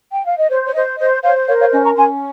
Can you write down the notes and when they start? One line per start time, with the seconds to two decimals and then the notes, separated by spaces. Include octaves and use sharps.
0.12 G5
0.25 F5
0.37 D#5
0.50 C5 C#5
0.66 C#5
0.75 C5 D#5
0.99 C5 D#5
1.23 C5 C#5 F5
1.47 A#4 C#5 F5
1.60 C#5 F5
1.72 C#4 D#5
1.84 A#5 C#6
1.96 C#4 G#5 C6